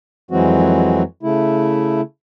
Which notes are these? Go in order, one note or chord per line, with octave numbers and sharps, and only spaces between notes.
F2 E3 F#3 G#3 C4 F#4
C#3 A3 E4